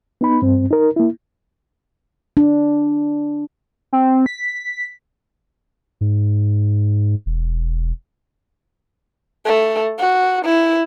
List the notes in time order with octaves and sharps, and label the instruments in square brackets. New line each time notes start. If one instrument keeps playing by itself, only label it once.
[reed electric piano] B3 D#4 B5
G2 C4
D#4 A#4
A#3 E4
[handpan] D4
[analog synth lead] C4
B6
[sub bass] G#2
E1
[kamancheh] A3
F#4
E4